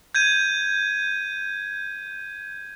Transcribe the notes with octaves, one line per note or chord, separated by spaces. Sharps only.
G6 G#6 D#7